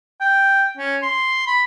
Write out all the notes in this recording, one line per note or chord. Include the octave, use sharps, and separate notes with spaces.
G5
C#4
C6
B5